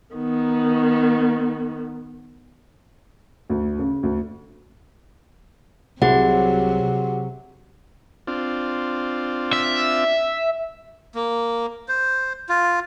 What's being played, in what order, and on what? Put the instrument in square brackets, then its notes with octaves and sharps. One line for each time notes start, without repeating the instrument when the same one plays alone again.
[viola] D#3 B3
[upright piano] D2
C#3
D2
[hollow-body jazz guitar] C2 [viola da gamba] C3 F#3 [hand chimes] F#4 G#4 F#5
[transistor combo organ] C4 D4 F4
[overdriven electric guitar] E5
[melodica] A#3
C5
F4